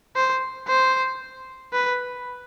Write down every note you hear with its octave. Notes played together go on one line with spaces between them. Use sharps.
C5
C5
B4